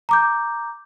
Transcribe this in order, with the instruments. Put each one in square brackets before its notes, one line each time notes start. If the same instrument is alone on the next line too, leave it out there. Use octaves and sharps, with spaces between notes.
[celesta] A#5 D6 G6